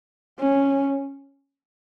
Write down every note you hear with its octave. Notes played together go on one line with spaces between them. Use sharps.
C#4